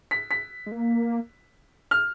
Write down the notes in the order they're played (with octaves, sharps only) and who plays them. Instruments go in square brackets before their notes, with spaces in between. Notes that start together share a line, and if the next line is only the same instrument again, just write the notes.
[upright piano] B6
B6
[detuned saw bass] G#3
A#3
[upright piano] F6